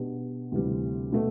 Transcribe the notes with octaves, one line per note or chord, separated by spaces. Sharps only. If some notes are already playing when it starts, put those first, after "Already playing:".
Already playing: B2 B3 D4 G4
D2 C3 E3 G3
B2 A3